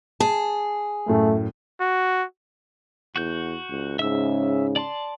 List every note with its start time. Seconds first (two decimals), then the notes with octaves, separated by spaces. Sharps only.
0.20 G#4 A5
1.08 F#2 A2 A3
1.81 F#4
3.16 E2 F#4 G6
3.70 C#2
3.99 G#2 C#3 C#4 E5 E6
4.76 D5 A5 C6